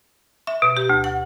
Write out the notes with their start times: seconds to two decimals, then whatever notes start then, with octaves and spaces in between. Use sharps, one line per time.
0.47 E5
0.62 B2
0.77 G4
0.90 D2
1.04 F#5